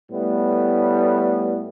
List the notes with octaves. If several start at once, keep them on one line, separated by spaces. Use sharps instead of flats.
A2 G3 A3 B3